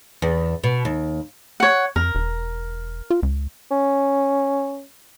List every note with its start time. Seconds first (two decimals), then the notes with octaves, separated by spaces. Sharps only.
0.22 E2
0.64 B2
0.85 D#2
1.60 C#5 F#5
1.96 F2 A#4
2.15 E1
3.10 F4
3.23 C#2
3.71 C#4